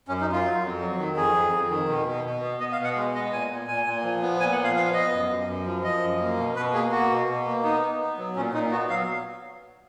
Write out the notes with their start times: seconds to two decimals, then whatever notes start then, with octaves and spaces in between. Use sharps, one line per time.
0.08 F#2 C#4
0.21 D#4
0.26 F#2
0.32 F4
0.45 F#3
0.63 F2
0.81 F#3
0.98 D#3
1.16 F2 G#4
1.34 F2
1.52 F2
1.70 D#3
1.88 B2
2.06 B2
2.24 B2
2.42 B3
2.60 B3 D#5
2.72 F5
2.79 B2
2.84 F#5
2.96 G#3
3.14 B3 D#5
3.32 A#2 G#5
3.50 A#2
3.68 A#2 G#5
3.86 A#2
4.04 F3
4.22 B3
4.40 A#2 G#5
4.52 F#5
4.58 F3
4.64 F5
4.76 B3 F5
4.94 B3 D#5
5.12 F#2
5.30 F#2
5.47 F#2
5.66 F3
5.83 F3 D#5
6.02 F#2
6.20 A#3
6.37 B2
6.56 B2 B4
6.73 A#3 G#4
6.92 A#3 F#4
7.10 B2
7.28 B2
7.45 A#3
7.63 B3 D#4
7.82 B3
7.99 B3
8.17 F#3
8.36 A#2 C#4
8.53 A#2 D#4
8.71 B3 F#4
8.89 F#3 F5